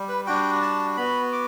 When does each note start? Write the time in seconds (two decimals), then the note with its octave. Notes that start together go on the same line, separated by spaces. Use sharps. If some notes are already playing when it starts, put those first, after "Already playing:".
Already playing: G3
0.09 B4
0.27 G3 D4 F#4 G5
0.62 A5
0.97 B3 F#4 B5
1.32 D6